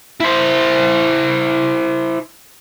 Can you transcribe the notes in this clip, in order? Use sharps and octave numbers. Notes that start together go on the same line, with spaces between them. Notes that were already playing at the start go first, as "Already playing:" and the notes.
E4 C5